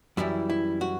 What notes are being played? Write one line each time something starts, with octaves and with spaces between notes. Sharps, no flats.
F#2 E3 G3 E4
E4
F#4